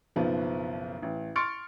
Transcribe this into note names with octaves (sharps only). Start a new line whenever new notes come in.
F#1 B1 F3 B3
A1
C6 C#6 F6 A6 C#7 D7